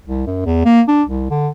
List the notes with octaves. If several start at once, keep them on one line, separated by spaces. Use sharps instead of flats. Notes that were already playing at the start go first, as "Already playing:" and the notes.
C2
F#2
E2
A#3
D4
C2
D3